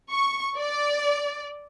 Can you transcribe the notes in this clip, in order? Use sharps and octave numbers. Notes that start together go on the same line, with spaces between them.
C#6
D5